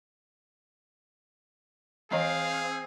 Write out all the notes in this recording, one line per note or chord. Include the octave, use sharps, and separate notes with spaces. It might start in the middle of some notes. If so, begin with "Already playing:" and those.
E3 C4 G#4 D#5 F5 A#5